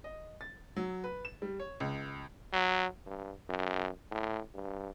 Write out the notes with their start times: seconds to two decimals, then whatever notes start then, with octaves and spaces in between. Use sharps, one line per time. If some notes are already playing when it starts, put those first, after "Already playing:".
0.04 D#5
0.41 A6
0.77 F#3
1.04 B4
1.25 E7
1.42 G3
1.60 C#5
1.80 C#2
2.53 F#3
3.06 G2
3.49 F#2
4.12 A2
4.54 G2